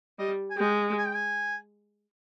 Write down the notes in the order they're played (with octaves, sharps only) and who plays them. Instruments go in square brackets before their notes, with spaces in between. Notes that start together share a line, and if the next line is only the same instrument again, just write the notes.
[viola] G3 [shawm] D#5
[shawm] G#5
[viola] G#3 [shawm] G5
[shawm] G#5
G5
G#5